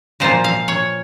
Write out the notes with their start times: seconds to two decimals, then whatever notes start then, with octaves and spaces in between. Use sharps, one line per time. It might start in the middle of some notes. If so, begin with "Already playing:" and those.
0.20 A#2 F3 A#3 F4 C5
0.44 F5
0.68 C#5